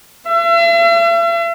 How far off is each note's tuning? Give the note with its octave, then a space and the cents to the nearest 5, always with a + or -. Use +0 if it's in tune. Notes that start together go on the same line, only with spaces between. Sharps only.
E5 +45